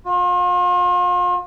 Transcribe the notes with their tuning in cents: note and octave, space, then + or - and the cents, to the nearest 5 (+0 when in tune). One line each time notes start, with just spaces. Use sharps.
F4 +40